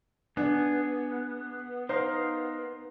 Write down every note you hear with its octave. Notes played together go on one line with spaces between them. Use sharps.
B3 D4 G#4
D#4 A#4 C5 F5